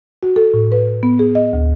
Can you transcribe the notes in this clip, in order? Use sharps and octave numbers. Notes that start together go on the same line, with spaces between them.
F#4
A4
A2
B4
B3
G#4
D#5
D2